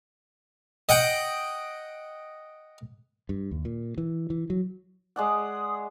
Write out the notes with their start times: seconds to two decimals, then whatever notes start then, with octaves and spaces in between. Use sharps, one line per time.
0.89 D#5 F#5 G5
3.29 G2
3.51 D#2
3.65 A#2
3.98 E3
4.30 E3
4.50 F#3
5.16 G#3 D5 F#5 D#6